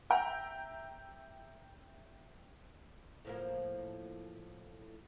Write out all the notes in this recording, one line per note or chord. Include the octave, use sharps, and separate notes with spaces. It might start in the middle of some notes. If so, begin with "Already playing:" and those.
E5 G5 A#5
A2 F3 A#3